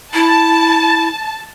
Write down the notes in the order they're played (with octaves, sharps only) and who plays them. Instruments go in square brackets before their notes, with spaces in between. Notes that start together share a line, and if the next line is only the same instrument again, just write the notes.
[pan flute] E4 [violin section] A5